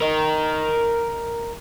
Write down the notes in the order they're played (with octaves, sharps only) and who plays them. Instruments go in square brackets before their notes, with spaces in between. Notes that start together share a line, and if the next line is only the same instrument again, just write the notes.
[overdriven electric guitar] A#4 D#5